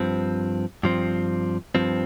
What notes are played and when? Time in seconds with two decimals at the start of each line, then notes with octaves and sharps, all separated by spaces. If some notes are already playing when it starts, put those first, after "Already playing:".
Already playing: G2 F3 C4
0.83 G2 F3 C4
1.75 G2 F3 C4